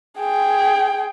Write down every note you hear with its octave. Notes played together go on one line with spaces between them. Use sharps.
G#4 G5